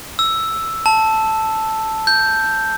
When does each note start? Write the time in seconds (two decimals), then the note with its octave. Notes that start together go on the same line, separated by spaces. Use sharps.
0.19 E6
0.86 A5
2.07 G6